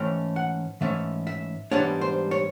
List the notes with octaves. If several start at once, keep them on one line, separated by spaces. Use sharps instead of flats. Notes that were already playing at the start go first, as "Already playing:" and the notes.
Already playing: G#2 E3 A3 C#4 G5
F#5
G#2 E3 A3 C#4 E5
E5
G#2 E3 G3 B3 D4 C#5
C5
C#5